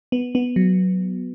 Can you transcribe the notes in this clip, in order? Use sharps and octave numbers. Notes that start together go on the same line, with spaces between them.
B3
B3
F#3